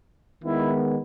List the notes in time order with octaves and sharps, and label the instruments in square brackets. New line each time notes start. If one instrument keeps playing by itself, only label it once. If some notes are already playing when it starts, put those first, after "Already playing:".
[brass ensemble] D#3 G#3 B3 E4